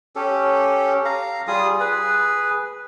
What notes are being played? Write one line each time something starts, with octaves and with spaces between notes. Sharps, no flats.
C#4 G4 A4
F5 A#5
G3 F4 G#4 D#6
G#4 B4